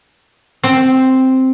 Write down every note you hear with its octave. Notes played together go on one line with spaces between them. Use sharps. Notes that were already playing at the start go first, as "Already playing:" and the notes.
C4